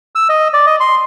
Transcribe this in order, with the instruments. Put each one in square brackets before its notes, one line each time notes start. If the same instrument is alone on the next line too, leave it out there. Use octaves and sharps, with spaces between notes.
[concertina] E6
D#5
D5
D#5
C6